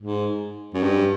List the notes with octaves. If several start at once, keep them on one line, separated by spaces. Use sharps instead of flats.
G#2
F#2
G2